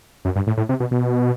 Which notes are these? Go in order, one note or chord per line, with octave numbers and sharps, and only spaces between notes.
F#2
G2
A2
A2
C3
B2
B2